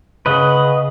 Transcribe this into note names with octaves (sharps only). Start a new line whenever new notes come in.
C#3 B4 D#5 F#5